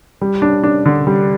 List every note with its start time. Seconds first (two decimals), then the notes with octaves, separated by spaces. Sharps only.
0.21 G3
0.42 D4
0.63 D4
0.86 D3
1.07 G3